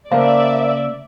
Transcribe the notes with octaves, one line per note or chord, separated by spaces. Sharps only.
C#3 A#3 A#4 C5 D5 E5 F5 A5